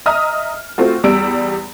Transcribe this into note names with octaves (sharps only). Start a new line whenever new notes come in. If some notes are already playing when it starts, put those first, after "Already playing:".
D#5 E5 A#5 D#6 F6
A3 C4 F4 F#4
E2 G3 E6 D7